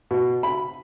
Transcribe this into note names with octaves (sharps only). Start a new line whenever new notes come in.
B2
B5